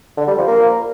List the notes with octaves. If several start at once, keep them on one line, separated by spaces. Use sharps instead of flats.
D3
G3
F3
A#3